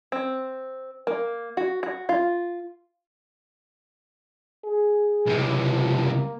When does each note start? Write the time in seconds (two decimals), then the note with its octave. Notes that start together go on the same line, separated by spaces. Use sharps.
0.12 C4
1.07 A#3
1.57 F#4
1.83 F#4
2.09 F4
4.64 G#4
5.27 C#2 C3
5.65 F3
6.02 A#3